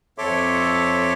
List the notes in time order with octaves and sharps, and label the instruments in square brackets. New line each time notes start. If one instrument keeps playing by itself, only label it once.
[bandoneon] F2 A4 C#5 E5 C6 D6